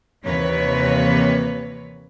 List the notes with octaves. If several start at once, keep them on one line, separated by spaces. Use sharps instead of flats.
D#2 C3 E3 A#3 B4 C#5